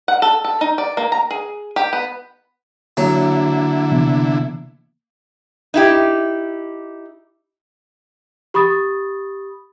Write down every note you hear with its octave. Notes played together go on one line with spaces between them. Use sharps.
F#5
A4
A4
D#4
D5
A#3
A#5
G#4
G4
B3
D3 F#3 A#3 E4 A#5
C3 E3 B3
D#4 E4 G4
G4 B5 C#6 D#6 A6